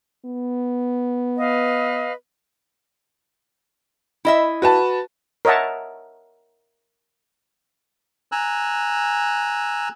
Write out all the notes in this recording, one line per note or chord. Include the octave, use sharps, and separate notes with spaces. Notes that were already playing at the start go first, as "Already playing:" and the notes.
B3
B4 D#5 F5
E4 D#5 E5
F#4 B4 A5
A#4 C#5 D#5 E5 F#5 A5
G#5 A#5 E6 F#6